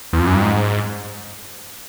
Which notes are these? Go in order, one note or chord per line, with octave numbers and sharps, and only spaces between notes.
E2
F2
F#2
G2
G#2